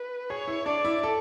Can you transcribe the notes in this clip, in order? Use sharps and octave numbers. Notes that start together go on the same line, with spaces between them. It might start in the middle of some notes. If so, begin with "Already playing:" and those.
Already playing: B4
G#4 C#5
E4
D4 D5
E4
A4